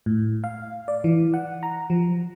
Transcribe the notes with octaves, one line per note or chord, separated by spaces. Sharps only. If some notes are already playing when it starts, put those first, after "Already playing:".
A2
F5
D5
E3
F#5
A#5
F3